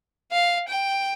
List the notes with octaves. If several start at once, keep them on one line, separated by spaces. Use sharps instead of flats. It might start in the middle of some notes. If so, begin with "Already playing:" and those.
F5
G5